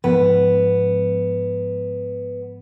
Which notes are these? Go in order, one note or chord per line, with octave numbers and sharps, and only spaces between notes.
G#2 F3 B3